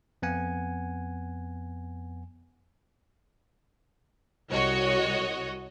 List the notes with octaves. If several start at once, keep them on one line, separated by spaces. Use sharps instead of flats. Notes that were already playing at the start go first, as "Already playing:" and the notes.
F2 B3 F#5 G#5
C2 F#4 C#5 D#5